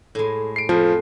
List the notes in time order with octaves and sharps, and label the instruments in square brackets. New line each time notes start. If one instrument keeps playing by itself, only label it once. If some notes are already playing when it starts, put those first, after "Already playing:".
[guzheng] A2 G#3
[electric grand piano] C7 D7
[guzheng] F2 [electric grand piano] F3